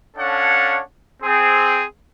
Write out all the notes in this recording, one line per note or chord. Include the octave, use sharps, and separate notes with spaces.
C#4 D4 A4 C#5 F5 F#5
C4 G#4